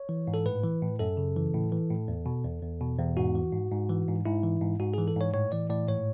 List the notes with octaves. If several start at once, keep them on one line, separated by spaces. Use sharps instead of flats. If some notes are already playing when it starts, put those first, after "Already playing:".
Already playing: C#5
E3
G#2
A4
A2 B4
E3
A2
F#2 A4
C#3
E3
A2
E3
A2
E2
B2
E2
E2
B2
E2
G#2 F#4
E3
G#2
G#2
E3
G#2
G#2 E4
E3
G#2
G#2 F#4
E3 G#4
A4
G#2 C#5
A2 C#5
E3 D5
A2 D5
G#2 C#5